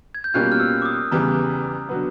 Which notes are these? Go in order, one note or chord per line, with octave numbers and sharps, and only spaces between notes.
G#6
G6
B2 G3 A#3 C#4 F4 F#6
F6
E6
D6
D#6
E2 C#3 E3 G3 A#5
D3 F#3 B3